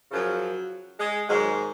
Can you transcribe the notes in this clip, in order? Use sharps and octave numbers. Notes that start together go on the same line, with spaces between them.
F#2 C#3 F3 F#3
G#3
G#2 D#3 F#3 G#3